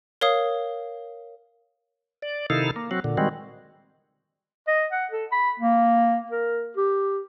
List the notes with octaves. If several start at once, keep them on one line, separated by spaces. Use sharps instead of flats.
A#4 C#5 F5 D#6
D5
C3 D#3 D#4 E4 A4 F5
A#3
F#3 C4 F#4
A#2 D3
D#3 G3 G#3 C4 F#4
D#5
F#5
A4
B5
A#3
A#4
G4